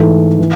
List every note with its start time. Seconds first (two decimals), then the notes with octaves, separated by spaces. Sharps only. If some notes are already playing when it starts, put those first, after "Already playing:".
Already playing: G#2 E3 A3
0.39 E3